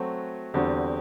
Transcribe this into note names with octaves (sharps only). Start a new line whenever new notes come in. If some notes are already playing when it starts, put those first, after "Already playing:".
Already playing: F#3 A3 C4 F#4
E2 D3 G3 C4 F#4